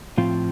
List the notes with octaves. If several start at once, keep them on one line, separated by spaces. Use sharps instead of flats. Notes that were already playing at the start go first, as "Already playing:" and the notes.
A2 F3 C4 F4